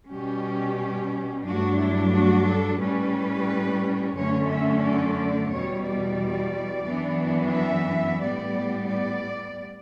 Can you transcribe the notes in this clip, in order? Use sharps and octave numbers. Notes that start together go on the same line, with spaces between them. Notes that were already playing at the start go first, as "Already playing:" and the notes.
B2 G3 C#4 G4
G2 F#3 A3 D4 F#4
E4
F#4
A4
A2 G3 C#4 B4
F#2 D3 A3 C#4 C#5
E5
D5
E2 B2 G3 C#5
D5
F#2 E3 B3 D4
E5
A2 G3 B3 D5
D5